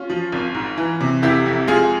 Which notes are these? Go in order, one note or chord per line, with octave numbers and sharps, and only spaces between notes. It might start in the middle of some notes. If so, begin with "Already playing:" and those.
Already playing: C#4 F4
F3
G#1
G#2
E3
C3
F1 E4 G4
F2
G#3 F4 G#4